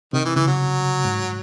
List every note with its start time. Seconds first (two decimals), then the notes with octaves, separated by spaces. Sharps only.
0.13 C3 D#3
0.25 E3
0.36 C#3 E3
0.47 F#3
1.05 G#2